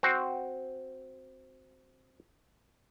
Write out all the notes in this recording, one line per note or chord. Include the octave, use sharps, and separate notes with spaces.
C4 F#4